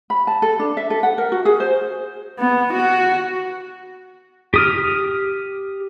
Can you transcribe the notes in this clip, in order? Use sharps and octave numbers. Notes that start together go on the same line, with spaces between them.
B5
A5
A4
D4
E5
A4
F#5
A#4
F#4
G#4
C5
B3
F#4
G4 D#6 F6